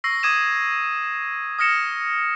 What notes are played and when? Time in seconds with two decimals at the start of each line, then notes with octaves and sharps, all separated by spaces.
0.04 C#6 E6 A#6 C7
0.23 D6 D#6 G#6 D#7 E7
1.59 D#6 F6 A#6 C#7 E7